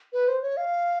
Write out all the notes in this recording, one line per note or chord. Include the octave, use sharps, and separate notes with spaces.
B4
C5
C#5
F5